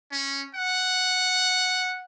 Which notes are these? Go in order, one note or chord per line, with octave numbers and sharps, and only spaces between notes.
C#4
F#5